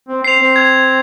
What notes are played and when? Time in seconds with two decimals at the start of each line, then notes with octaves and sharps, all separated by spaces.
0.08 C4
0.24 C4 C7 F7
0.40 C4
0.56 G#6